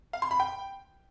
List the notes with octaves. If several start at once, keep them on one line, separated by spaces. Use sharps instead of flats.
F5
C6
B5
G5